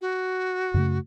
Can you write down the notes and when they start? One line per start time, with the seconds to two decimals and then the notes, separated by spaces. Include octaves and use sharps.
0.01 F#4
0.74 F#2 C#3 A3